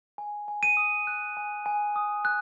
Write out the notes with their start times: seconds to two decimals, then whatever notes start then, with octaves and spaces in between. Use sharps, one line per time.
0.18 G#5
0.48 G#5
0.63 D#7
0.77 D#6
1.07 F#6
1.37 G#5
1.66 G#5
1.96 D#6
2.25 F#6